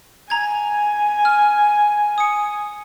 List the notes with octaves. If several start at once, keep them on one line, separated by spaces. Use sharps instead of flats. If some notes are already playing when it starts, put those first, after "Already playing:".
G#5 A#5 G#6
F6
D#6 C#7